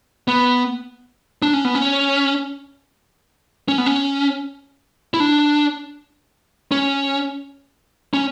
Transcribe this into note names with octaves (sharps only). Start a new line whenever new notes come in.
B3
D4
C#4
B3
C#4
C#4
B3
C#4
E4
D4
C#4
C#4